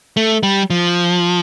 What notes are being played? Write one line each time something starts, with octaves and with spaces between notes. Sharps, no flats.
A3
G3
F3